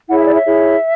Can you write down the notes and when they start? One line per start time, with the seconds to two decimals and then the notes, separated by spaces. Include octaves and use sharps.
0.08 E4 G#4 C#5 F#5
0.18 E5
0.25 D5
0.34 C#5 E5
0.45 E4 G#4 C#5